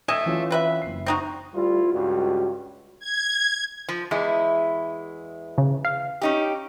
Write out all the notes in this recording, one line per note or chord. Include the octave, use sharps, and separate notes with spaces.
A3 D#5 G#5 E6 E7
E3 C#4 F4
C4 B4 E5
F#1 C7
C4 D#4 F#4
D2 G3 E4 F4
C#2 G2 F#4
G#6
F3
E2 G#3 E4
C#3
F5
C#4 D#4 G4